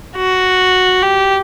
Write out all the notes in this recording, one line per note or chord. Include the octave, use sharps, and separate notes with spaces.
F#4
G4